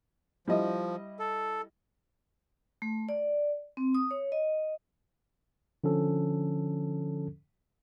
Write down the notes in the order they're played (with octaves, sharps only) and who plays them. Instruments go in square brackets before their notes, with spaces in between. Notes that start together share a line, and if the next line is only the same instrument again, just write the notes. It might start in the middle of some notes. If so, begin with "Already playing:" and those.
[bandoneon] F3 [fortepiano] G3 E4 D#5
[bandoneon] A4
[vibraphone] A3
D5
C4
D#6
C#5
D#5
[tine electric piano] D3 F3 C#4 A4